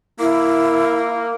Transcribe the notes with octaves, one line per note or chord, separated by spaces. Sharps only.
A#3 E4